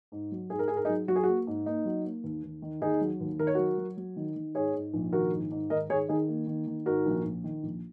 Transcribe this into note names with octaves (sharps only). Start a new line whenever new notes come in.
G#2
F#3
G#2 G#4
A#4
G#2 G#4
A#4
D#4 G#4
F#3
F#3 F#4
G#4
A#3 F#4
G#2
A#3 D#4
F#3
A#3
D#2
D#2
D#3
D#2 D#4 G#4
F#3
D#2
D#3 A#4
C#5
F#3 F#4 A#4
F#3
F#3
D#3
D#3
G#2 G#4 C#5
G#2
A#1
D#3 F#4 A#4
G#2
G#2
D#3 A#4 D#5
D#3 G#4 C#5
D#3 D#4 G#4
A#3
D#3
D#3
G#2 F#4 A#4
A#1
A#1
D#3
A#1